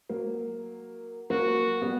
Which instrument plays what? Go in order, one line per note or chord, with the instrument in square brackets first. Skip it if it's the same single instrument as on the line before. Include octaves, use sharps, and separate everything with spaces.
[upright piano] F#3 A#3
[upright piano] F#3 A#3 [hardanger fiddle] F#4
[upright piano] G3 B3